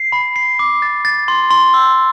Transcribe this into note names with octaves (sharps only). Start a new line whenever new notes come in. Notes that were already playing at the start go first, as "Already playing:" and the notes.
Already playing: C7
B5
C7
D6
A6
A6
C6
C6
E6